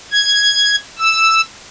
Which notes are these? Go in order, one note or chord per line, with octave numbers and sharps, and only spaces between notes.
G#6
E6